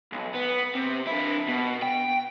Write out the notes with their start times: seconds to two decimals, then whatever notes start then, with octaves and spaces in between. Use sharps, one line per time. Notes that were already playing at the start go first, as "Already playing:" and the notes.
0.12 B1
0.34 B3
0.75 C3
1.07 D3 E4
1.49 B2
1.82 G5